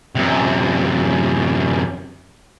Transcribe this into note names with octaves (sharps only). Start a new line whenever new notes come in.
F#2 C3